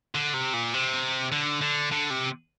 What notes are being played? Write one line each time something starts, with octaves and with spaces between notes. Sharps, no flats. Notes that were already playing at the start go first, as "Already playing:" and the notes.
D3
C3
A#2
C3
D3
D3
D3
C3